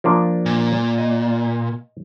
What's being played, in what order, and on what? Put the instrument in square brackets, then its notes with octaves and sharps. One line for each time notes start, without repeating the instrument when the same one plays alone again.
[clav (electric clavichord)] F3 A#3 D4
[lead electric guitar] A#2
[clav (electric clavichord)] D#5